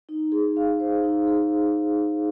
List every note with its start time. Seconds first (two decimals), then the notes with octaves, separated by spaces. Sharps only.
0.09 D#4
0.32 G#4
0.57 F5
0.80 C5
1.04 D#4
1.27 G#4